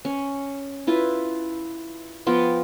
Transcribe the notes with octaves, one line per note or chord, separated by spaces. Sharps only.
C#4
E4 F4 B4
F3 B3 F4 G5